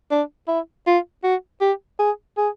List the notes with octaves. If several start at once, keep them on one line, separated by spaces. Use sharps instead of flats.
D4
E4
F4
F#4
G4
G#4
G#4